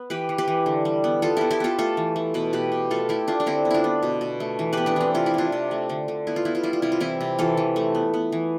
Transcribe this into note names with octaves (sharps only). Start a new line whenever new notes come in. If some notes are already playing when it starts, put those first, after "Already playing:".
Already playing: B3
E3 G4 B4
E3
G4 B4
E3
D3
G3
B3
B3 F4 A4
B3 E4 G4
E4 G4
B3 F4 A4
A3 F4 A4
E3
A3
B2 B4
B2 G4 B4
B2
A3 F4 A4
A3 E4 G4
A3 D4 F4
D4
D3 C4 E4
B3
D4 E4 F4
B3
B2
B2
A3
E3
B3 G4 B4
B3 D4
E3 C4
C3 F4
E4
C3 D4 F4
C3
A3
D3
D3
B3 E4
F4
B3 E4
F4
G3 E4
F4
C3 E4
F4
E3 C4 E4
C3
E3 F4 A4
E3
A3
B3
B3
E3